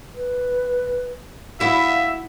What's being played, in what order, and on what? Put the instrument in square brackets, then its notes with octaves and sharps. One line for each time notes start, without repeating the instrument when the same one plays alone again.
[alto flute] B4
[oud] E4 F#4 [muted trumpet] E5 [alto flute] F5